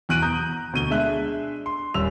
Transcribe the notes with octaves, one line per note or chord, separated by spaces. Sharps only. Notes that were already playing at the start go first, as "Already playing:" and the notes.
E2 B2 F#6 D7 D#7 F#7
A#5 D#6 G6
D2 B2 D#7 G7
G#3 D4 E5 F#6
C6
D#1 G3 C#4 E6 F7